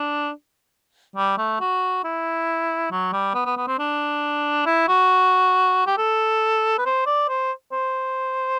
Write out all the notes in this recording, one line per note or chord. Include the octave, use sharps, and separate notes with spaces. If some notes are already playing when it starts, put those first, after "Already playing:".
Already playing: D4
G3
A3
F#4
E4
F#3
G3
B3
B3
B3
C4
D4
E4
F#4
G4
A4
B4
C5
D5
C5
C5